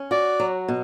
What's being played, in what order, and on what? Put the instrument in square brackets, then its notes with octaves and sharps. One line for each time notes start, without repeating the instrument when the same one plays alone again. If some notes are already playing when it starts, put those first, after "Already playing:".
Already playing: [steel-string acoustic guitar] C#4
[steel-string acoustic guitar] F#4 [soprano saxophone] D5
[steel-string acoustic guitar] F#3
B2